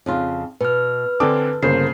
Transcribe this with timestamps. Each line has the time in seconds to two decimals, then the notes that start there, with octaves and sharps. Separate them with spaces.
0.06 F2 C#3 F4
0.61 B2 B4 F6
1.20 D3 C4 D4 A4 G#5 D6
1.63 G1 C#3 A#3 C5 C7